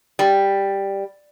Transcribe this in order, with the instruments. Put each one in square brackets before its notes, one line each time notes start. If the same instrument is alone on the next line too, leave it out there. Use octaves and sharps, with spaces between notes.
[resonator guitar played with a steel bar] G3